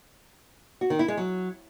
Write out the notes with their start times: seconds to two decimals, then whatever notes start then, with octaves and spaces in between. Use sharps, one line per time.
0.81 F#4
0.90 D#3
0.99 E4
1.08 G#3
1.17 F#3